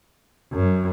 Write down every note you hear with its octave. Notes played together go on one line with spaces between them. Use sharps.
F#2